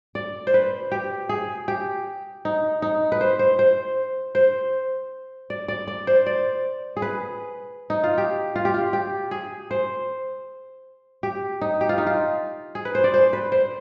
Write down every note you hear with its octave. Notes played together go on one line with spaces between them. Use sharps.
D5
C5
B4
G4
G#4
G4
D#4
D#4
B4
C5
C5
C5
C5
D5
D5
D5
C5
D5
G#4
B4
D#4
F4
G4
F4
G4
F4
G4
G#4
C5
G4
D#4
G4
F4
D#4
F4
G#4
B4
C5
D5
C5
B4
C5